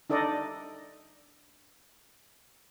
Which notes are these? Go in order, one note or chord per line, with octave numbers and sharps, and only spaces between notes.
D4 D#4 A4 D5 D#5